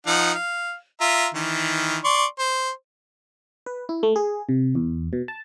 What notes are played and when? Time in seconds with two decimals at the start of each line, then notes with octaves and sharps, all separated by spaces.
0.07 F3 D#4 F#5
0.34 F5
1.01 F4 E5 A#5
1.35 D#3 E3
2.04 D5 C6 C#6
2.39 C5
3.66 B4
3.89 E4
4.03 A3
4.16 G#4
4.49 C3
4.75 E2
5.13 B2
5.28 A5